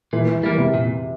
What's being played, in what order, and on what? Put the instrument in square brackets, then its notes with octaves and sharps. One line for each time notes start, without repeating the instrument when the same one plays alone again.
[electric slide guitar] A#2 [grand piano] E3
[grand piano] E3
[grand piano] E3 [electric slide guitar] G3 A#3
[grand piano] C3
[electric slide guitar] A#2